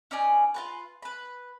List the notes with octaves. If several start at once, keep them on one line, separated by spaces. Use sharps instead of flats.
C#4 D#4 D5 G#5
F4 F#4 B4
B4 B5